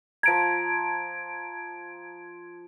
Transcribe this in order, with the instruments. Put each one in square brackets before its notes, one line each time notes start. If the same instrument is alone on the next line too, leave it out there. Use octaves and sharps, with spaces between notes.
[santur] F3 A#5 [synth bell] G#6 D7